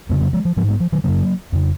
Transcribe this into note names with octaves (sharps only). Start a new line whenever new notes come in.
F2 C#3 G#3 B3
F#3 A#3
F3 G#3
F3
G#2 F3 G#3
G#3 B3
F3
D#3 F#3
F#2 C#3 F#3 A#3
F2 C#3